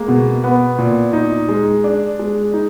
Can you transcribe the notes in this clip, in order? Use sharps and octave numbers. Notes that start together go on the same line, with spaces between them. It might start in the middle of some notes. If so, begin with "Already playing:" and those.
Already playing: G#3 A#3
B2
B3
A#2
D#4
G#3
D4
G#3
D#4